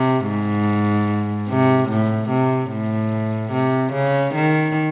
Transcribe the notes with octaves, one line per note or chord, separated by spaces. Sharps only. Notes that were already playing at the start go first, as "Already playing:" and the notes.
Already playing: C3
G#2
C3
A2
C3
A2
C3
C#3
D#3